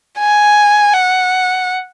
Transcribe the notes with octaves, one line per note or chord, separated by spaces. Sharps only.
G#5
F#5